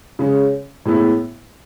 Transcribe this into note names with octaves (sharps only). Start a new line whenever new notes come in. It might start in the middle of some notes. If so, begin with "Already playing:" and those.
C#3 G#3 C#4
A2 G#3 B3 E4